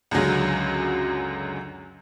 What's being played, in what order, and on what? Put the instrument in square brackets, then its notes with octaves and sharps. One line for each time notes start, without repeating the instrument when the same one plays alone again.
[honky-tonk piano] C#2 F#2 D3 F#3 G#3